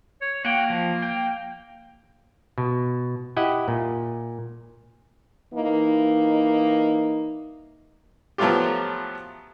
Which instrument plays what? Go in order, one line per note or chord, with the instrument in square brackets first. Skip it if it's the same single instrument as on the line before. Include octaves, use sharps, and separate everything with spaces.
[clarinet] C#5
[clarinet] A#3 [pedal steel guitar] F#4 G5
[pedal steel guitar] F3
G5
[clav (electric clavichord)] B2
E4 G4 D#5 F#5
A#2
[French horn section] E3 A#3 D#4
[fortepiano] F3 F#3 A3 B3 F4 G4